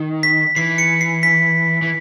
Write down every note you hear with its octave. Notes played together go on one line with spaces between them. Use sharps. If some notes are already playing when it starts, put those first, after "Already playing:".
Already playing: D#3
B6
E3 C7
C#7
C7
B6
E3